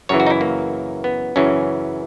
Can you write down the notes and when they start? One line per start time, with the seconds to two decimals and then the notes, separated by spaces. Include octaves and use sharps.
0.09 F#2 C#3 E3 C#5
0.20 F#4
0.27 D#4
0.30 E4
0.41 A#3
1.04 B3
1.36 F#2 C#3 E3 C#4